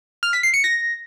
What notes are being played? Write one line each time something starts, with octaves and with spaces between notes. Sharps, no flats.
F6
B6
C7
C#7
A#6